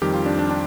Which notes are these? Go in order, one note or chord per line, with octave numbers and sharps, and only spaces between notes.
F2 D#3 G3 G4
F4
D4
D4
D4